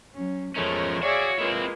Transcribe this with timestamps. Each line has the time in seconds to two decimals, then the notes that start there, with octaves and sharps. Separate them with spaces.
0.14 F#3 C#4
0.56 E2 F3 G#3 A3 C#4 A#4 C#5
1.03 F#4 G#4 C#5 D5 E5 F5
1.39 G#3 A#3 C4 E4 F4 B4